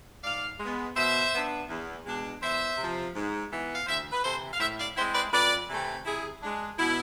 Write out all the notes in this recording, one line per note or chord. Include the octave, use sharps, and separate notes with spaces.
G#2 D5 F5
G#3 B3
B2 C5 E5
B3 D4
E2
B2 G#3 D4
E2 C5 E5
C3 F3
G#2
E3 B3
F5
D2 C5 E5
B4
C3 E3 A4 C5
F5
A2 C5 E5
D5 F5
G#3 C4 E4 C5 E5
B4 D5
F2 B4 D5
C3 E3 A3 C4
C3 E4 G#4
G#3 D4
B2 E4